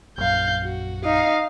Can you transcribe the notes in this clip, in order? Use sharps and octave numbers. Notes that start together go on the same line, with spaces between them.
A#1 F#2 F5 G6
F#4
D#4 F5